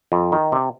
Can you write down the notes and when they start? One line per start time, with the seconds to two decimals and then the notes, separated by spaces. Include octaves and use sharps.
0.12 F2
0.32 D#3
0.52 C3